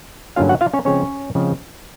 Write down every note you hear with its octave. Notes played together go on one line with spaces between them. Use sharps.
G2 D3 F#3 A#3 C#4 F4 F5
F#4 F#5
F4 F5
C#4 C#5
C#3 F3 G#3 C4 C#4 C#5
C#3 F3 G#3 C4